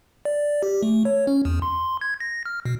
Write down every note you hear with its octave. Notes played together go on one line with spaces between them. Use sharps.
D5
G4
A3
C#5
C#4
E2
C6
G#6
A#6
F6
B2